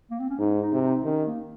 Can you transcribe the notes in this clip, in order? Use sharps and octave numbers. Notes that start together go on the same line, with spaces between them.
A#3
C4
C#4
G#2 D#4
D#4
C3
D#4
D#3 C#4
A#3